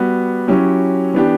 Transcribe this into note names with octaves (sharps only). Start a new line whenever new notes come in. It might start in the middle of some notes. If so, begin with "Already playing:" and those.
Already playing: G3 B3 F#4
F#3 C#4 E4 G4
E3 B3 D4 G4